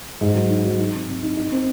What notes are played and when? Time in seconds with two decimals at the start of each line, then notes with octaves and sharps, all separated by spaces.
0.21 G#2
0.35 F#3
0.50 D#4
0.65 F#3
0.79 D#4
0.94 C3
1.08 C3
1.23 D#4
1.37 D#4
1.52 C4